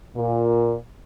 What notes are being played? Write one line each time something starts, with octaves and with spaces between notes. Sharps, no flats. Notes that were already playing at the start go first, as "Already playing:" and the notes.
A#2